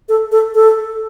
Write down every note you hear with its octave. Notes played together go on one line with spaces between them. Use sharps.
A4
A4
A4